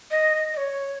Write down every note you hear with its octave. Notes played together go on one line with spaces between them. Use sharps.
D#5
D#5
C#5